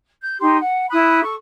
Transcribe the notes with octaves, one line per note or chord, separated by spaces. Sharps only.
G6
D#4 G4 C6
F#5
E4 B5 D#6 F#6
A4 C#6